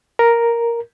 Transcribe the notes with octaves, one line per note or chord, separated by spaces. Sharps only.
A#4